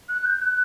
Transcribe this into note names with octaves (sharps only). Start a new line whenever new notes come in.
F#6
G6
F#6